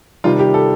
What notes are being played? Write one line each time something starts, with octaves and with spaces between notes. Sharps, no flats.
C3 D#3 G3 F4
G4
A4